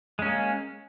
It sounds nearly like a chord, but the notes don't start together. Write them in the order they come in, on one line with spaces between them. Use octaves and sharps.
G#3 C#4 A#3